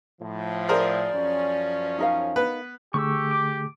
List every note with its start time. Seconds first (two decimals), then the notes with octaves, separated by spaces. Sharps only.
0.21 A2 F3
0.69 G#4 A#4 C5 D5
1.15 F#2 F3 C#4
1.99 D#4 A#4 F5
2.36 B3 B4
2.94 D3 A3 G4 G#4 C#6 E6
3.31 D6